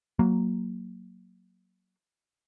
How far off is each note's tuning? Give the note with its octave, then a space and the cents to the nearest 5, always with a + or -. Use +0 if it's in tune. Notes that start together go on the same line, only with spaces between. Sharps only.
F#3 +0 A#3 -5